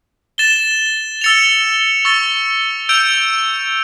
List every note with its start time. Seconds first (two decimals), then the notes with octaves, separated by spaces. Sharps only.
0.38 A6 E7 G7
1.21 E6 A6 C#7 F7
2.05 C#6 E6 A6
2.89 E6 G6 D7 F7